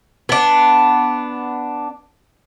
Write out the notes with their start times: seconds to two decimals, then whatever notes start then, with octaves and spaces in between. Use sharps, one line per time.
0.29 B3 D4